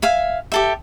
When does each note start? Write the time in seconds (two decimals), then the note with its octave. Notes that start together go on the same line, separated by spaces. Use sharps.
0.02 E5 F5 G#5
0.52 G4 A4 E5